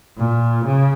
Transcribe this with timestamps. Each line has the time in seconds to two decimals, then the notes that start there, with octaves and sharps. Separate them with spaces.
0.18 A#2
0.65 C#3